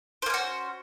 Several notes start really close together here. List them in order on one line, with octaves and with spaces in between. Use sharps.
C5 A#3 C#4 F#4